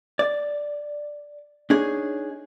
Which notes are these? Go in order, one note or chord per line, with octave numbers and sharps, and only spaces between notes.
D5
D4 D#4 G#4 C#5